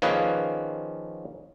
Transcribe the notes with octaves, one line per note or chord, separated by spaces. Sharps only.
D#3 F3 A#3 C#4 G#4 B4